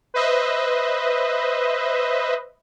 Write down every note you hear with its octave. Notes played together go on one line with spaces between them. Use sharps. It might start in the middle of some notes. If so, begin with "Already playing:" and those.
B4 C5 D#5 E5